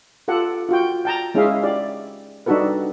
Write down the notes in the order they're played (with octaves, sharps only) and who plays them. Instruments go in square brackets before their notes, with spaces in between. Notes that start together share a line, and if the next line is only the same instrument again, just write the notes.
[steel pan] F4 G4 A4 F#5
F4 F#4 G5
G5 A5 A#5
G#3 C#4 E4 G#4 E5 F5
E4 G4 D5
G3 D4 D#4 F#4 A4 B4